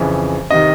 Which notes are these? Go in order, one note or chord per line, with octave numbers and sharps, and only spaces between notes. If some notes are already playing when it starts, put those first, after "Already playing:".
Already playing: F2 C#3 E3
C3 D#3 D#5